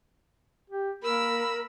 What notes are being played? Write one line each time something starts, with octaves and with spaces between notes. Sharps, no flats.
G4
A#3 A#4 B5 E6